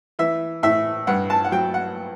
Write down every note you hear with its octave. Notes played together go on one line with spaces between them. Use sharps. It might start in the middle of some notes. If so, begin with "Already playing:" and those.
E3 E5
A2 E5
G2 F#5
A5
F#5
F#3 G5
F#5